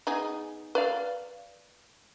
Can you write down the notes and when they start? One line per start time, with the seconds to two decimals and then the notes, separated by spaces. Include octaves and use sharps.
0.07 B3 D#4 G#4
0.75 B4 D5 F5